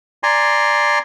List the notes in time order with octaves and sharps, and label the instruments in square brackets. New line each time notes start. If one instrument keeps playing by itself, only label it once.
[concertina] D5 G#5 A#5 C6